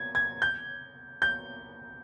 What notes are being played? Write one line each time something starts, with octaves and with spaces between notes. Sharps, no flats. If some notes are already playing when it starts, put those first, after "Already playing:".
Already playing: G#6
G#6
G6
G6